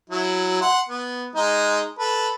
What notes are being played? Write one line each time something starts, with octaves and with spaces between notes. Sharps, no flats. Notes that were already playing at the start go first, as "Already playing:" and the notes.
F#3 E4
F#5 C6
B3
G#3 D#4
A4 B4